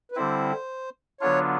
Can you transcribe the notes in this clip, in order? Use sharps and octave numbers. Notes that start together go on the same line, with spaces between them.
B4
D3 G3 C4 E4 C5
D3 F#3 B3 D4 F4 C#5